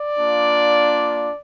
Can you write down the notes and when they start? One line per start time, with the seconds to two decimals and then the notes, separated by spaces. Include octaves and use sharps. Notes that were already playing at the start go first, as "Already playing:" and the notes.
Already playing: D5
0.17 A#3 D4 F4